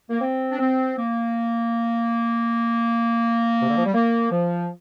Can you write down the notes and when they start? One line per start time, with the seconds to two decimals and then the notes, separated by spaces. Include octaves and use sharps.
0.10 A#3
0.21 C4
0.49 D4
0.58 C4
0.95 A#3
3.62 C3
3.69 D3
3.77 F3
3.86 G3
3.93 A#3
4.30 F3